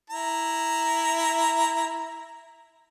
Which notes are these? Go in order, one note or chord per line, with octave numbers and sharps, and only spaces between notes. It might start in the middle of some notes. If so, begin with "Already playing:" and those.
E4 A#5